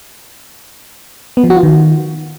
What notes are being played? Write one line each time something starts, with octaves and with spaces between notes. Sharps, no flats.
B3
F3
F#4
F4
D#3